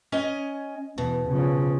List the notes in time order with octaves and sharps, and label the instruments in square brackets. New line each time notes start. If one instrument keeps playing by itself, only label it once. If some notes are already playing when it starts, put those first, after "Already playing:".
[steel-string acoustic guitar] C#4 D#5 G#5
[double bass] E2 [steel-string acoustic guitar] B2
[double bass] C#3 F3